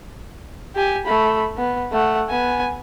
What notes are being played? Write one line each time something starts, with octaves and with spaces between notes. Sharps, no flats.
G4 G#5
A3 B5
B3
A3 F#5
B3 G#5